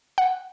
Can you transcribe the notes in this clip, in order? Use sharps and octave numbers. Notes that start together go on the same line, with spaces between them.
F#5